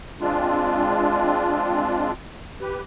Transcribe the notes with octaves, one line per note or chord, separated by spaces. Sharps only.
G#3 C4 D4 F4
G4 B4